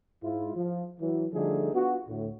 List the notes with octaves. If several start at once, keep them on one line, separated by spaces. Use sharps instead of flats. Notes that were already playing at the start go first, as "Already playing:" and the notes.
G#2 E4 F4
F3
E3 F#3
D3 F3 G3 A3 D#4 G#4
B3 D4 F4 F#4
D2 A2